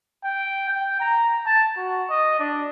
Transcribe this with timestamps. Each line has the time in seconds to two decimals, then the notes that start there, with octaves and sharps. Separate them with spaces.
0.24 G5
0.69 G5
1.00 A#5
1.46 A5
1.77 F#4
2.10 D#5
2.39 D4